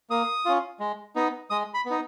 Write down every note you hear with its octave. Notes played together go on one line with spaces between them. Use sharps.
A#3 D#6
C#4 F4
G#3
B3 D#4
G#3 D#6
B5
B3
D#4